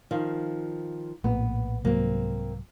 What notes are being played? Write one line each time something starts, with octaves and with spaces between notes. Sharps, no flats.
D#3 F3 F5
A#1 A2 A#3 B3
C2 G#2 F#3 A#3 C4